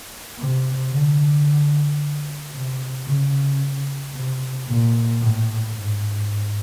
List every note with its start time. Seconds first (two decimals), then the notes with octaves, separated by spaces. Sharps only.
0.37 C3
0.91 D3
2.52 C3
3.06 C#3
4.13 C3
4.66 A#2
5.19 A2
5.73 G#2